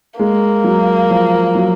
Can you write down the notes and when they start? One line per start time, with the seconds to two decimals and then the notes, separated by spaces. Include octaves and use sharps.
0.19 G#3 A#3
0.64 F#3
1.10 F3
1.55 F#3